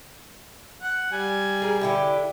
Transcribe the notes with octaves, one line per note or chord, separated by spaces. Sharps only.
F#5
G3 G#5
G#4 A#4
D3 E4 G4